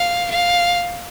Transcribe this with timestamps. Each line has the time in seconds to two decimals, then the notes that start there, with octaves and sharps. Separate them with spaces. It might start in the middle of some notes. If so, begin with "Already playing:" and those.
Already playing: F5
0.30 F5